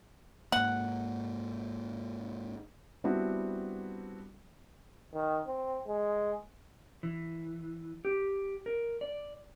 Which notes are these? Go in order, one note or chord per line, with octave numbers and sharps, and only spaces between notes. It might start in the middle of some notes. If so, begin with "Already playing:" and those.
G#2 A#3 F#5
G3 B3 C4 D4 E4 F#4
D#3
C4
G#3
E3
G4
A#4
D5